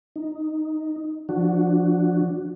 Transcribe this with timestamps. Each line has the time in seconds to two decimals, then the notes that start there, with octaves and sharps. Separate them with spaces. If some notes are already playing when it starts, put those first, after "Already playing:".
0.16 D#4
1.29 F3 D4 F#4